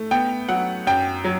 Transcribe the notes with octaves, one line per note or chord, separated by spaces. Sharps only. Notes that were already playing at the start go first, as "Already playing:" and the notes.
Already playing: A3
B3 G5
F#3 F#5
F#2 G5
F#3